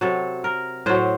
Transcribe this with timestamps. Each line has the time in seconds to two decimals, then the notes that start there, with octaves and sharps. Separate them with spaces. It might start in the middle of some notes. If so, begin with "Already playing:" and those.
0.01 C3 F#3 A4
0.44 A#4
0.86 A2 F#3 C5